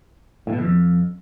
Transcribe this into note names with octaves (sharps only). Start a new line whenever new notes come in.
A2
B2
E2
F2